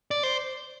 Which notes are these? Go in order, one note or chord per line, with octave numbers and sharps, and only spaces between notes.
D5
C5